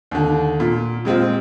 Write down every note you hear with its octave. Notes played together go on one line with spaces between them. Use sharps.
D#2 D3
A#2
A#2 G#3 C4 F4